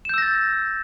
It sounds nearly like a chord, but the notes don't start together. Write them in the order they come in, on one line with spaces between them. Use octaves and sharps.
E7 G6 E6 A#6 A6